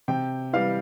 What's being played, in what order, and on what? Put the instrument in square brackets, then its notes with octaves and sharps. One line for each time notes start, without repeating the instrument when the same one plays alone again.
[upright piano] C3 G5
E3 G3 F5